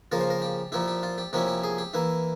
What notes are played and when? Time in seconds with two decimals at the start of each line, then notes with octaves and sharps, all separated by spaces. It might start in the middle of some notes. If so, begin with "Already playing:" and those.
0.12 C#3 F3 A#3 F4 A#4
0.21 C5
0.30 A#4
0.42 G4
0.72 A#2 F3 A#3 E4 G4
0.88 G4
1.03 F4
1.18 G4
1.33 C3 F3 A#3 C#4 E4 G4
1.48 G4
1.64 G#4
1.78 G4
1.94 E3 A#3 E4